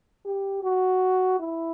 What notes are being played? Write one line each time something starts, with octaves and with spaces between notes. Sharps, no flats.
G4
F#4
E4